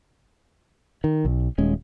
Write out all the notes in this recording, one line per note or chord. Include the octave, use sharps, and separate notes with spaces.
D#3
B1
D#1 G#3 C#4